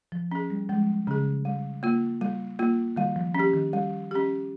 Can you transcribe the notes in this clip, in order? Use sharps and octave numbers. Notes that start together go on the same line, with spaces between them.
F3
C#4 G#4
G3
F3 G#3
C#3 C#4 G#4
G3
A#3 F4
G3
A#3 F4
D#3 G3
F3
C#4
G4
D#3
G3
C#4 G4